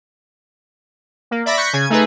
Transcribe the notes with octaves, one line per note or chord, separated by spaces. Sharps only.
A#3
D5 E5 B5 A6 A#6
C#6 F#6 G6 A#6 B6 C#7
C#3 G#5 G#6
A3 D#4 G#4 B4